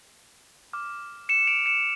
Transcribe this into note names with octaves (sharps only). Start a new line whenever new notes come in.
D6 F6
C#7 E7
D7 F7
C#7 E7